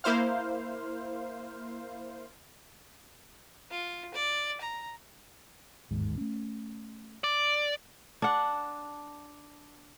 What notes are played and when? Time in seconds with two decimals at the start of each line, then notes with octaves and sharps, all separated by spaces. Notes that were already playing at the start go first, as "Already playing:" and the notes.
0.04 A#3 E4 C5 F5
3.70 F4
4.15 D5
4.61 A#5
5.91 G1 D#2 G#2
6.18 A3 C#4
7.24 D5
8.22 D4 F#5